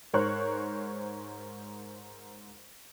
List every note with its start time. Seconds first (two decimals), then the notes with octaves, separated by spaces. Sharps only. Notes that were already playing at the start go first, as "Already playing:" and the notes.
0.13 G#2 A#4 C5 C#5 C#6 F#6